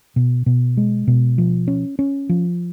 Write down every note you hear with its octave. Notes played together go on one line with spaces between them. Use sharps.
B2
B2
G#3
B2
F3
C#4
C#4
F3